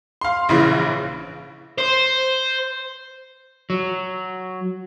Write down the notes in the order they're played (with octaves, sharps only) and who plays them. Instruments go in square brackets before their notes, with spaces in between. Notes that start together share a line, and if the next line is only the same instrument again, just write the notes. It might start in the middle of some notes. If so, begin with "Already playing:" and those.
[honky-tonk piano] F5 C6
A#1 C#3 E3
[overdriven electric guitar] C5
[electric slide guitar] F#3